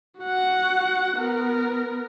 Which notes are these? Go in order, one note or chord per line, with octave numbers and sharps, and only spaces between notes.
F#4 F#5
B3 A#4